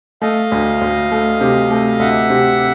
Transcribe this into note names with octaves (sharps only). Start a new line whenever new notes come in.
A3 D#5 F5
D2
D2
A3
C3
A3
D2 E5 F#5
C3